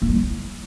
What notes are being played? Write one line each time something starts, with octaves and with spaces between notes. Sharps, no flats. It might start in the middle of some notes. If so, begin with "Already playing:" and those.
A#3
G3
E4